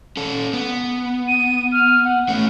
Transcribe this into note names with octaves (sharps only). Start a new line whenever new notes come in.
C#4 A4
B3
D#7
F6
F#5
A3 C#4